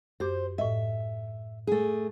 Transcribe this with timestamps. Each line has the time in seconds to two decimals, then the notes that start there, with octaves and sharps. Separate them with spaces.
0.20 F#2 G4 C5 D6
0.58 A2 D#5 E5
1.67 A3 G#4